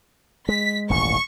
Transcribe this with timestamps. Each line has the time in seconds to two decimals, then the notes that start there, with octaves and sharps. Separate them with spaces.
0.49 G#3 B6
0.90 D#1 A1 G#2 C#6